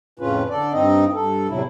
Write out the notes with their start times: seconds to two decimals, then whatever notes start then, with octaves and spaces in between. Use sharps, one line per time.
0.19 F2 A2 C#3 C#4 F4 B4
0.50 D3 A4 D5
0.73 G2 C4 D#4 D#5
1.14 G2 A4
1.49 E2 A2 C3 F#3 E4